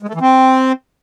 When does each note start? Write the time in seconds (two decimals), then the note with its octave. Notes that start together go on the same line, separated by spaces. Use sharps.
0.03 G#3
0.09 A3
0.15 E3
0.21 C4